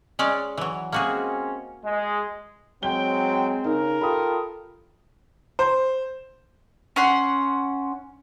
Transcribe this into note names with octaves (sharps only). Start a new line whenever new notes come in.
G#3 C#4 D5
E3 F#3
G#3 A#3 C4 C#4 F#4 G#4
G#3
F#3 G#3 C4 G5 G7
C#3 D#4 A#4
F4 G4 A4 B5 D#6
C5
C#4 F#5 C6